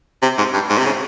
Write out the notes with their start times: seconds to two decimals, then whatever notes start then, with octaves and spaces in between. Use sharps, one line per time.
0.22 C3
0.38 G#2
0.54 G2
0.70 G#2
0.78 C3
0.86 C#3